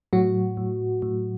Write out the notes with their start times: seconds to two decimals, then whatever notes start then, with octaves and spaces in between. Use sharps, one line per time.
0.13 A2 F#3 F#4
0.57 A2
1.02 A2